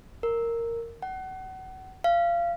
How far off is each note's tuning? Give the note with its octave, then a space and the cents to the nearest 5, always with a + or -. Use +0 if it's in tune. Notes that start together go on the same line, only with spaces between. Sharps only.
A#4 -10
F#5 +30
F5 -25